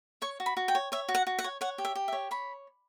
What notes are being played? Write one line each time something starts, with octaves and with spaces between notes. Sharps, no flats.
C#5 C#6
F#4
B5
F#4
G5
C#5
C#5 E5
F#4
F#5
F#4
F#5
C#5
C#5 F#5
G4
E5
G4
E5
C#5
C#5 B5